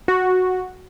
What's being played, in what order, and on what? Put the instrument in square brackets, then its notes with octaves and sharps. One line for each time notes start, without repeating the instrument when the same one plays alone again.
[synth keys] F#4